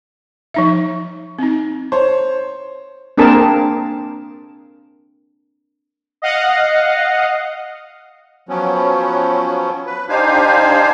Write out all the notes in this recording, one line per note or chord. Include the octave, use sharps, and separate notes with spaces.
F3 D#4 E5
C4 D#4
C5 C#5
A#3 C4 D4 G#4 A#4 A5
D#5 F5 F#5
F3 F#3 B3 C#4
B4
D4 D#4 G4 C5 F5 G#5